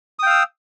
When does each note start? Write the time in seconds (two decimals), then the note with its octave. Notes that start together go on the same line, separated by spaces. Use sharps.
0.19 D#6
0.23 G5
0.26 F5
0.30 E6